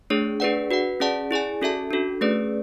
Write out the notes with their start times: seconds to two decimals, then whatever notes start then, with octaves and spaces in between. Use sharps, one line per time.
0.10 A3 D4 G#4 C#5
0.40 D4 G#4 B4 D5 F#5
0.71 F#4 B4 F#5
1.00 C#4 G#4 D5 F#5 A5
1.31 E4 G#4 D5 G#5
1.61 C#4 F#4 A4 E5 A5
1.91 D4 F#4 A4
2.21 A3 C#4 G#4 B4 D5